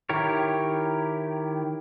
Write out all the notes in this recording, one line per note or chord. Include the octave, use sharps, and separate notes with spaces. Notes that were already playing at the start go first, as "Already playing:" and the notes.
D#3 E4 G4 A#4 C#5